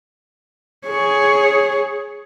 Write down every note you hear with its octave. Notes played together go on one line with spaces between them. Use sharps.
G#4 C#5